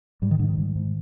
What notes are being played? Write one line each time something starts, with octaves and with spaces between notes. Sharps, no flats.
G#2 G3
D#3
G#2 D3
D#3
G#2
G#2